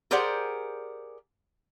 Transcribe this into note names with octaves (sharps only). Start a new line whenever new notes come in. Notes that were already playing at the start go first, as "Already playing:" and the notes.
G4 G#4 A#4 C5 D5 F#5